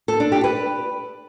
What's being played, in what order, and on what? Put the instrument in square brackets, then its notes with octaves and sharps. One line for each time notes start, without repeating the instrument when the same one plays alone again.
[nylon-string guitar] A4
D4
G4
B4